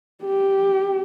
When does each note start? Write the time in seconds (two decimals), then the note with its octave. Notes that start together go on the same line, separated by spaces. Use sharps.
0.25 G4